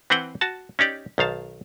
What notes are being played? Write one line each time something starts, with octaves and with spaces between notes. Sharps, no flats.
E3 C4 B4 C5 F#5 G5
F#4 A5
C#4 D#4 G4 D5
B1 D#3 F5 A5